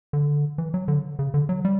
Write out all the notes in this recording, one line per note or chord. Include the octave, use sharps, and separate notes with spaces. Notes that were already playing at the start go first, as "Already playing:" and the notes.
D3
E3
F#3
D3
C#3
D3
F#3
G3